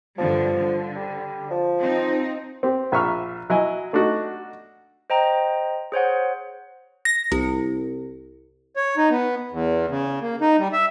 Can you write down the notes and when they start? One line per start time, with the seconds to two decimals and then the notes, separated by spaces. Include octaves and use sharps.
0.18 G2 D3 F3 G3
0.59 D3
0.95 G3
1.50 F3
1.79 C4 D#4
2.63 C4 G4
2.92 A#1 E5 C#6 F6
3.50 F#3 E4 D#5 G#5
3.93 A3 D4 D#4 F#4
5.10 C5 D#5 G5 A#5
5.92 G#4 C5 C#5 F#5
7.05 A#6
7.32 C2
8.76 C#5
8.97 D#4
9.10 B3
9.51 E2
9.90 C#3
10.21 A#3
10.41 D#4
10.59 G3
10.73 E5